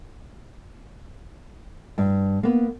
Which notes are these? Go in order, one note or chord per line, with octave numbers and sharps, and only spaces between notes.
G2
A#3 B3